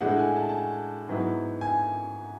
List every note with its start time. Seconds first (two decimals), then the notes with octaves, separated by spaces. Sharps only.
0.01 A2 G#3 D4 F#5
0.19 G#5
0.36 A5
0.49 A5
0.54 G#5
1.08 G#2 F#3 B3 E4
1.61 G#5